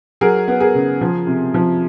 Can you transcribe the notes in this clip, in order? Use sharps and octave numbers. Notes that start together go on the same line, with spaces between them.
F#3 G#4 A#4
B3
G#4 A#4
C#3
F3
C3
F3